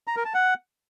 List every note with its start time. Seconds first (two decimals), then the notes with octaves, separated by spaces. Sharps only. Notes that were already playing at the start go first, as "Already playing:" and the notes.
0.07 A#5
0.16 A#4
0.25 A5
0.34 F#5